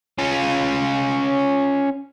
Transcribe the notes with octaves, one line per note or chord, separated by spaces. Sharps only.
C#4 F4